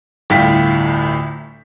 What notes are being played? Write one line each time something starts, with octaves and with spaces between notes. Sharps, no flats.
G1 D2 A2 F4 G5 B6